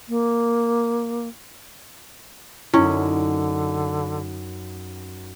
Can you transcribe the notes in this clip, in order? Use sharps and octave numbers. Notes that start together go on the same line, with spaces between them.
A#3
F#2 D3 C#4 D#4 E4 B5